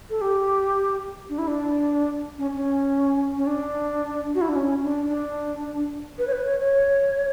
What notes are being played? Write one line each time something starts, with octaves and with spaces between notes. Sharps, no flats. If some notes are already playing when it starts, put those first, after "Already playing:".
A4
G4
D4
E4
D4
C#4
C#4
C#4
D4
F#4
E4
D4
C#4
D4
D4
B4
C#5
B4
C#5
C#5